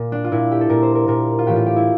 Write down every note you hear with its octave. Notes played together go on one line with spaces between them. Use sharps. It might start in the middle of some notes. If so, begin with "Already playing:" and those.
Already playing: A#2
D4
F4
A#2 E4
G4
A4
A#2 A#4
C5
A#4
A#2 A#4
F4
A2 E3 G4
F4
G4
E4